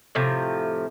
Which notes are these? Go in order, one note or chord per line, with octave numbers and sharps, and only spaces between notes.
A2 C3 F3